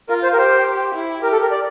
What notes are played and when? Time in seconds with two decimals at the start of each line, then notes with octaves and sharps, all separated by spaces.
0.09 F4 A#4
0.23 C5
0.33 A#4
0.37 G4 C5
0.95 E4
1.23 G4 A#4
1.32 A4
1.42 A#4
1.51 D5